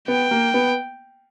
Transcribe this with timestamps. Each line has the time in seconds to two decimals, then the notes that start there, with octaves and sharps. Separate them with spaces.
0.08 B3 G5
0.31 A#3
0.54 B3